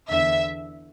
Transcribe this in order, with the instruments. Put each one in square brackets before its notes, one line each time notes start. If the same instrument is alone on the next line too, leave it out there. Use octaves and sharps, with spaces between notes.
[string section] E2 D3 E5